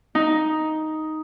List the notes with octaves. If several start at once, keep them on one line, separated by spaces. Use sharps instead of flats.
D#4